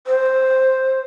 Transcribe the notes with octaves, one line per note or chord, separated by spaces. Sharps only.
C5